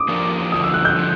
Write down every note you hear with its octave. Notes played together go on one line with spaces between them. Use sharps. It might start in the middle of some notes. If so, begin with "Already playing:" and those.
Already playing: D6 D#6
F3 A#3 D4 G4 A#4
F#2 D3 F3 D#6
E6
F#6
G6
D3 F3